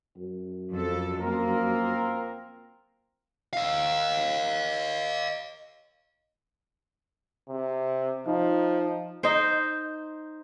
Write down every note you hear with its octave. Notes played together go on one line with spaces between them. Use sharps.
F#2
F2 A4
A#3 C4 F4 A#4
D#5 F5
C3
F3 D#4
D#4 C5